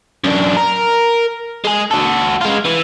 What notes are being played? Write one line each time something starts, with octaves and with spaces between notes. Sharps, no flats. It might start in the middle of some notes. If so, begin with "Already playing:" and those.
F#2 D4
A#4
G#3 G#4
F#4 A4
G#3 F4
E3